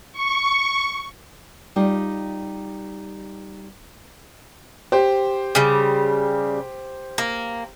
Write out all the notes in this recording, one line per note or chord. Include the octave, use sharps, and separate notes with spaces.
C#6
G3 D#4 F4 G4
G4 C5
C#3 G3
A#3